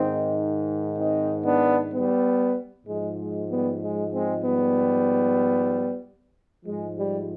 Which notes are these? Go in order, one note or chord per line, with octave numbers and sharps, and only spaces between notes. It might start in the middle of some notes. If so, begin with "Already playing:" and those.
Already playing: G#2 D#3 C4 D#4
C4 D#4
B3 D4
G3 B3
G#2 F3 G#3
G#3
G3 B3
G#3
G#3 C4
G3 B3
G#2 F3 G#3
G3